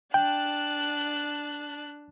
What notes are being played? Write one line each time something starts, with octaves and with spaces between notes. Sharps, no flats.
D4 G5 A5 F#6